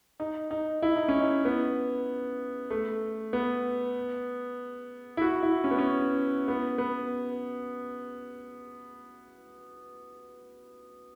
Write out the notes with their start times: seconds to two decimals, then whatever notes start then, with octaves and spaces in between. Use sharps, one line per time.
0.20 D#4
0.51 D#4
0.82 E4
0.96 D#4
1.08 C#4
1.21 D#4
1.45 B3
2.70 A3
3.33 B3
5.17 E4
5.21 F#4
5.43 E4
5.64 C#4
5.71 B3
5.78 C#4
6.48 B3
6.78 B3